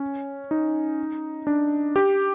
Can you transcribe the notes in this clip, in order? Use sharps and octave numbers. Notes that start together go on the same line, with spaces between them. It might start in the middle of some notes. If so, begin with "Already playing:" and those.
Already playing: C#4
D#4
D4
G4